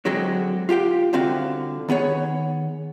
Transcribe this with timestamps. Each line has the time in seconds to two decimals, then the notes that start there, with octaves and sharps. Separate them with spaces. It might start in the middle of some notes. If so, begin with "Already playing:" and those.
0.05 D3 F#3 G#3 C4 F#4 D#5
0.69 F4 G4 F5 G5
1.13 C2 D3 C4 F#4 F5
1.88 D#3 B3 G#4 C#5